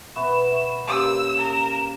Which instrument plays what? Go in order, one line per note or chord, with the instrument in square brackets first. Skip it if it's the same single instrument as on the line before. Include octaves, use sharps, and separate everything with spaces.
[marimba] B2 E5 C#6 [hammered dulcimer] B3 B4 [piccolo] E7
[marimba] E5 B5 C#6
[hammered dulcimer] C#3 A#3 [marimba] G4 C6 [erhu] E6 [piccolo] E7
[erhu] A#4